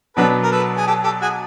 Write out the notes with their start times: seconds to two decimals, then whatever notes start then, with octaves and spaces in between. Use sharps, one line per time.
0.17 B2 F#3 B3 D4 A4 B4
0.43 A#4
0.52 A4 B4
0.77 G#4
0.87 G4 A4
1.04 G4 A4
1.22 F#4 G#4